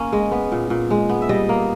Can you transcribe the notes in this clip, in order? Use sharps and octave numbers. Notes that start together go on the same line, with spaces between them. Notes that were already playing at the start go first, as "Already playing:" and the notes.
Already playing: A#3 C#4
G#3 D#5
B3
A#2
A#2
G#3
B3
E5
G3 D#5
A#3